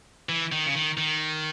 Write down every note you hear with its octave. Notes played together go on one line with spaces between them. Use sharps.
E3
D#3
C#3
D#3
D#3